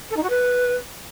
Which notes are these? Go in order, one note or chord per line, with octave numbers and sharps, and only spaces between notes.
A4
D#4
F#4
B4